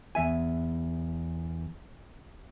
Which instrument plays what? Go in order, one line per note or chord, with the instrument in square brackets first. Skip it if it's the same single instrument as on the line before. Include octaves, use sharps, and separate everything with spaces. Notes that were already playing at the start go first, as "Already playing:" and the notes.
[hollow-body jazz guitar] E2 E5 G#5